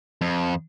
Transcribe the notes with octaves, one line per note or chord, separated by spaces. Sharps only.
F2